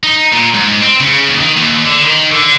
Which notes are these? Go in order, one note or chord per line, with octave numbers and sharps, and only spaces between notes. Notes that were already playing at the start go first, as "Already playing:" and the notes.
D#4
A#2
G#2
C4
C#3
D#2
D#3
D#2
D3
D#3
D3